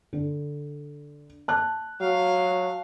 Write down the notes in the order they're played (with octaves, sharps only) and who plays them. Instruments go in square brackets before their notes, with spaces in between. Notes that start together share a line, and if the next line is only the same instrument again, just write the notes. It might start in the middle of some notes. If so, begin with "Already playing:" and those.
[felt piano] D3
A5 F#6
[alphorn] F#3 [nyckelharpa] F5